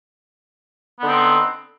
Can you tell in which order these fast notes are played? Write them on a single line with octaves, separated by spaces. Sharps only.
B3 D3 D#4 C4